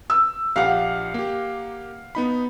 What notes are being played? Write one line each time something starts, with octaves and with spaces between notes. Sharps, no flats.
E6
A#1 G4 F5 F#5
A#3 G4
B3 D#4 B5